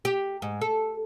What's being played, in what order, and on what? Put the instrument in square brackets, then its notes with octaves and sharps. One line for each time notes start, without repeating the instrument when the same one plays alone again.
[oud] G4
G#2
A4